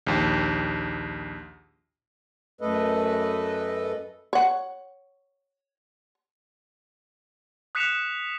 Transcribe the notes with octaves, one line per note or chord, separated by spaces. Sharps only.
A#1 D#2
F#2 A3 A4 B4 D#5
C#5 F#5
D#6 F#6 B6 C#7 E7 F7